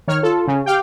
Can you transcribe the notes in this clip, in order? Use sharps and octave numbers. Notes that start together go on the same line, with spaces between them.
D#3 C#5 F6
F4 A4
C#3 C#4
G4 F5 G5